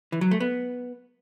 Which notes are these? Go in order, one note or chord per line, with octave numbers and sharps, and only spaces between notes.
E3
F#3
A3
B3